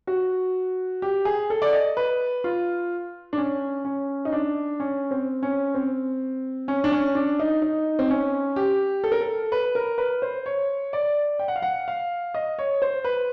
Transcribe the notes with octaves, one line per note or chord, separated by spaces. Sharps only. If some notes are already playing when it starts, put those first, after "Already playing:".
F#4
G4
G#4
A4
D5
D#5
B4
F4
D4
C#4
C#4
D#4
D4
C#4
C4
C#4
C4
C#4
D4
C#4
D4
D#4
D#4
C4
C#4
G4
A4
A#4
A4
B4
A#4
B4
C5
C#5
D5
G5
F#5
F5
F#5
F5
D#5
C#5
C5
B4